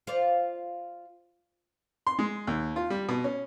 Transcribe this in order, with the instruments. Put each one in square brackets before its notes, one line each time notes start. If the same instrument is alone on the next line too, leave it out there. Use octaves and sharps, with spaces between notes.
[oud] F4 C5 D5
[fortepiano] C6
G#3
D#2
F4
G3
B2
C#4